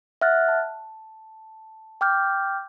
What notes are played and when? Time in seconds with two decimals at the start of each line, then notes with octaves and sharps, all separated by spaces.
0.21 E5 F#5 F6 F#6 A6
0.48 A5
2.01 G5 D6 F6 G6